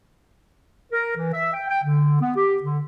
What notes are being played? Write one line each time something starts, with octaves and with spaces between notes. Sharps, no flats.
A#4
E3
E5
G5
G5
D3
B3
G4
D3